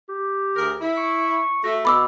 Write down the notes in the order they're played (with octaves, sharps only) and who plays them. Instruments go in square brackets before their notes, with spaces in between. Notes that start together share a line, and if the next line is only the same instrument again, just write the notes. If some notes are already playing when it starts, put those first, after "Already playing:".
[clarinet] G4
[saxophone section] D2 G#4 A#4
E4
[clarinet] C#6
[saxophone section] A3 [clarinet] F#4 [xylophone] A#6
[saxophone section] B2 [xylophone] B5 D6 E6